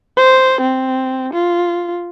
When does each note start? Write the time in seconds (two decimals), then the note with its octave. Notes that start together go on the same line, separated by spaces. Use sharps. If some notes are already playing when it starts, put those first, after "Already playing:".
0.17 C5
0.61 C4
1.34 F4